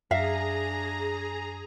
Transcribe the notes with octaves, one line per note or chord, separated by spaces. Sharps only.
F#2 D4 G#4 E5 F5 A#5 A#6